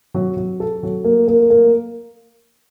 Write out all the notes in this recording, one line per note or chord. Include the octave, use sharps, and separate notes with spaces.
F#3
F#3
A4
F#3
A#3
A#3
A#3